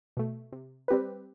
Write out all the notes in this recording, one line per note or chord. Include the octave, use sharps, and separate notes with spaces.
B2 A3
C3
G3 C4 G4 B4